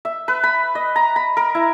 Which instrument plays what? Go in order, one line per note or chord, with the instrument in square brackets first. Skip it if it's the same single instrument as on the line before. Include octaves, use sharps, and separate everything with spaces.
[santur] E5
B4
B5
D#5
A#5
B5
A#4
E4